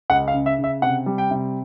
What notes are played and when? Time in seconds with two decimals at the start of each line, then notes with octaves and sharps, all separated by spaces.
0.10 C#2 F#5
0.28 F5
0.34 C#3
0.46 E5
0.59 C#3
0.64 E5
0.82 C3 F#5
1.06 G3
1.18 G5
1.31 C3